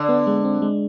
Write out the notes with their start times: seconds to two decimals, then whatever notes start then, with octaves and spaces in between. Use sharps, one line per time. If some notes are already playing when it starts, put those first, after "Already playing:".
Already playing: D3
0.09 B3
0.27 G#3
0.45 C4
0.62 G#3